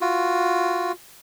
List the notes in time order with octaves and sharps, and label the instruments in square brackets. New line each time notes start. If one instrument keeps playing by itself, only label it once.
[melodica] F4 F#4